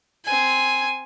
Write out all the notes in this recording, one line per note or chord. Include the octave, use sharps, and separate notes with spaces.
C4 G#5